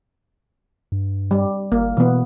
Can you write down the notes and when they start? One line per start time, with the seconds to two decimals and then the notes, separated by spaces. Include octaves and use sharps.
0.92 G2
1.31 G3
1.72 G1 A#3
1.97 B2 E3 B3